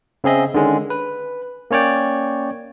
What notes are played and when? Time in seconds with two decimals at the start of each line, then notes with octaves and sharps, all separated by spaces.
0.24 C#3 C4 G#4 D#5 E5
0.54 D3 D#3 G#3 C#4
0.90 B4
1.71 A#3 C#4 C#5 D5 G5